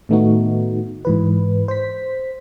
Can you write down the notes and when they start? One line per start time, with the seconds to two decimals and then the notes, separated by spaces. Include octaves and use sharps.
0.09 A2 D#3 A3 B3 D#4 F#4
1.05 G#2 E3 B4
1.68 C5 B6